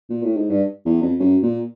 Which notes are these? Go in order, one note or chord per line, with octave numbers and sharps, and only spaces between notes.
A#2
A2
G#2
G2
E2
F2
F#2
A#2